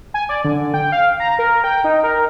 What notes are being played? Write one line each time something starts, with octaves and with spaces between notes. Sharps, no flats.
G#5
D5
D3
G5
F5
A#5
A#4
G5
D#4
A#4